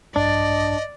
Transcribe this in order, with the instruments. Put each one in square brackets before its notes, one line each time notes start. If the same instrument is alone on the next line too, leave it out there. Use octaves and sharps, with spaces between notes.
[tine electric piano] A#1 G2 [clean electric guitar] D4 [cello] D5 [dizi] D#5